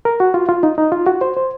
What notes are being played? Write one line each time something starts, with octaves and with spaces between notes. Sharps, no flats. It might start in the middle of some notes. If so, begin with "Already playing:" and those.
A#4
F#4
F4
F4
D#4
D#4
F4
F#4
C5
C5